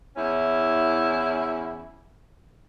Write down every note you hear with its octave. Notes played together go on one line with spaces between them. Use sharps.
E2 C#4 E4